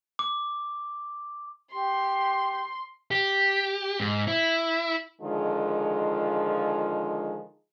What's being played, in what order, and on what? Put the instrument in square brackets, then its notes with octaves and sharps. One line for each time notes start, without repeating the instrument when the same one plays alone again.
[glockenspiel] D6
[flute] G4 [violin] C6
[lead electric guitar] G4
G#2
E4
[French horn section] D3 D#3 F3 G#3 F4 G#4